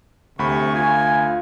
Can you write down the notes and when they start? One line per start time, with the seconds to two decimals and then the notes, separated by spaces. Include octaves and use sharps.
0.39 D2 C3 B5 C#6
0.75 F4 G#5